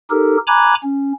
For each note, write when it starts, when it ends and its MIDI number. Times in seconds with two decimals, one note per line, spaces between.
0.10 0.37 63
0.10 0.37 67
0.10 0.37 69
0.10 0.37 70
0.47 0.75 80
0.47 0.75 82
0.47 0.75 83
0.47 0.75 86
0.47 0.75 90
0.47 0.75 92
0.83 1.13 61